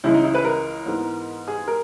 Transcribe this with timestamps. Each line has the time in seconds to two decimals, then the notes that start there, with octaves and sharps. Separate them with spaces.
0.04 C#2 C#3 E3 G#3 E4
0.14 D#4
0.24 E4
0.35 B4
0.45 A#4
0.86 G#2 E3 G#3 B3
1.48 G#4
1.68 A#4